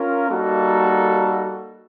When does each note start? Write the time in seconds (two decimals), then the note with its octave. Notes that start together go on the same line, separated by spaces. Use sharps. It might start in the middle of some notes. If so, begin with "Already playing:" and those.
Already playing: C#4 F4 A#4
0.28 G3 A#3 D#4 F#4 A4